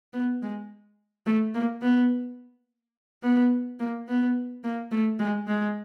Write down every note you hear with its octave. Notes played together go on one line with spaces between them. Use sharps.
B3
G#3
A3
A#3
B3
B3
A#3
B3
A#3
A3
G#3
G#3